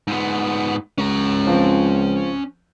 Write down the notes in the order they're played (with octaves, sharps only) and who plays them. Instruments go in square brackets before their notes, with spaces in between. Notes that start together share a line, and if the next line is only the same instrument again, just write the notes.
[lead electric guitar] G#2 B3
[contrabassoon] C#2 [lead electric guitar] C#4 A#5
[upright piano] F3 C4